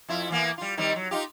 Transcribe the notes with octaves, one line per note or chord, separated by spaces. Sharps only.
F2 E4 F4
E3 A#3 B3
G3 F4
D#3 G3 C4
F#3
D#4 F4 G4